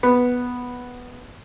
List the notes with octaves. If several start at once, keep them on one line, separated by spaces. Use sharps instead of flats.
B3